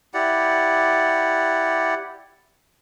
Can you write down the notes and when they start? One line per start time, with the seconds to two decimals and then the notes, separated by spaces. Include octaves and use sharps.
0.14 E4 G4 D5 F#5